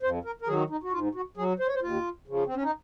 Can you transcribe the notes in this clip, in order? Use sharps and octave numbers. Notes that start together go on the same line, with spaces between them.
F2 C5
A#4
A#4
D#3 F#3 G#4
D#4
F#4
G#2 F4
F#4
F#3 G#4
C5
C#5
C5
D#2 F4
C#3 F3
C4
C#4
D#4